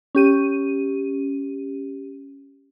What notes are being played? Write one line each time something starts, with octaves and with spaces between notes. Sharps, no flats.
C#4 G4 D#7